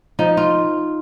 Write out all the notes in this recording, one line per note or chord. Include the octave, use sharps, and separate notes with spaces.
F3 D#4
F4